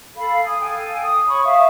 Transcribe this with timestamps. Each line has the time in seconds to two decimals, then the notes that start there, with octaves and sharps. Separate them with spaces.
0.16 A4 F5 B5
0.43 G#5 D#6
0.60 A4 F5 G5 G#5
1.02 D#6
1.27 C#5 B5 C#6
1.44 E5 F5 C#6 D#6